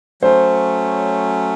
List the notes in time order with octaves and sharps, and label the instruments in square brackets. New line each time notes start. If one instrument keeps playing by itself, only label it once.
[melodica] F#3 A3 C#4 [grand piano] C5